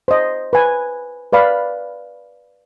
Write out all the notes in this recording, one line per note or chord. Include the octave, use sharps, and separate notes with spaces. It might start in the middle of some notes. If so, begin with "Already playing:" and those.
C5 D#5
B4 G#5
B4 D5 F5 B5